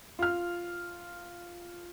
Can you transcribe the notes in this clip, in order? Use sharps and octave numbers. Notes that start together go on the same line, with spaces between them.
F4 F6